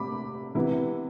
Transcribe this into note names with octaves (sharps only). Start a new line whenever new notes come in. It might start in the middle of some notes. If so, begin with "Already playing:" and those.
Already playing: C3 B5 D6
C3 E3 B3 E4